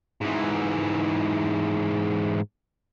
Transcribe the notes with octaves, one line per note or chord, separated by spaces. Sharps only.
G#2 E3